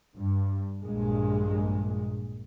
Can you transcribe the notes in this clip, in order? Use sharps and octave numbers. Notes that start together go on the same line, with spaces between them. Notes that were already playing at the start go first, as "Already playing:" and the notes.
G2
A#1 G2 A#2 G#3